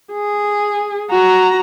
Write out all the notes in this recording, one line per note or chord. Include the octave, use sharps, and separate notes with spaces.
G#4
F#4 A#5